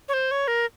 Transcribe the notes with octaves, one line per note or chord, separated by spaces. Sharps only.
C#5
C5
C#5
A#4